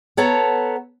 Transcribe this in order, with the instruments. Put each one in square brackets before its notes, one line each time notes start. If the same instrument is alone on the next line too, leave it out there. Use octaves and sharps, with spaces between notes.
[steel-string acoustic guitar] B3 A4 C#5 F#5 A5 A#5